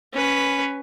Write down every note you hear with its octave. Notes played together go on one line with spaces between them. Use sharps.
C#4 B4